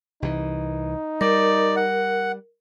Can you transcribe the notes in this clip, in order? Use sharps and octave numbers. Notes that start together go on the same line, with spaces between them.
C2 E3 D#4
G3 A#4 D5
F#5